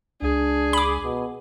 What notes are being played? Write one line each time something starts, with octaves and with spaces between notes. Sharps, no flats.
C#2 D4 G#4
B5 D6
B2